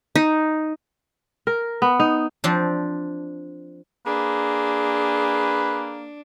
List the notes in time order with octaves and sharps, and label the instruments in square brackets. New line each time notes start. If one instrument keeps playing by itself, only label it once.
[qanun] D#4
[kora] A#4
B3
D#4
[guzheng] F3 C4 D4
[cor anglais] A#3 [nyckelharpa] D4 [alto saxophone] G#4 [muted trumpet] B4